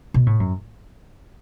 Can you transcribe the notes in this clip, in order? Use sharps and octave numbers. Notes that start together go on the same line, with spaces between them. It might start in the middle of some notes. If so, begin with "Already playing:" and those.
B2
A2
F#2